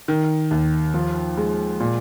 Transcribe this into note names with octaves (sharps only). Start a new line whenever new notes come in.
D#3
D#2
F3
G#3
A#2